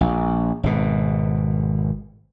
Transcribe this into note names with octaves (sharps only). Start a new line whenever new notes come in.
A#1
G#1 B2